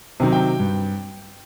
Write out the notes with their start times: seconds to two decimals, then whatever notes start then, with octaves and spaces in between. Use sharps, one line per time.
0.20 C3 D#3 F#3
0.32 G5
0.59 G2